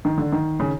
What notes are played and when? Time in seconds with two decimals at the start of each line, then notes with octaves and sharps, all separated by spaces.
0.05 D#3
0.18 D3
0.32 D#3
0.60 C#3